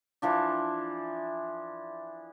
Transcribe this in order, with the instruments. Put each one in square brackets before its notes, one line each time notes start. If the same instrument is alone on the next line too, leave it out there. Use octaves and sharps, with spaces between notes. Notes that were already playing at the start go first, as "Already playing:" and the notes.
[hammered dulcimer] E3 F3 D4